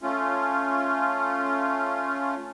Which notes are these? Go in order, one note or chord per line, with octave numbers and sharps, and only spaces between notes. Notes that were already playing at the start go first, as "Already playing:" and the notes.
A3 C#4 F4